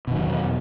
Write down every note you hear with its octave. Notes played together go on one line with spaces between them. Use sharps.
E2 B2 D#3 F#3